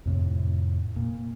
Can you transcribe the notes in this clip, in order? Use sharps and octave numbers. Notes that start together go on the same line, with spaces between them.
F2 A2 C3
A#2